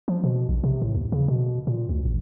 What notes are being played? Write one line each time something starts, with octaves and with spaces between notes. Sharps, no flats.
F3
B2
A#1
C3
A2
D#2
C#3
B2
A#2
D2
A1